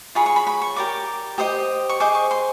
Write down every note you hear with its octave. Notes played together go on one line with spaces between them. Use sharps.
F4 G#4 C#5 B5
C#6
B5
B5
C#6
G4 A#4 D5 D6
G4 C5 D#5 D#6
C#6
G#4 C5 D#5 D6
C#6
C6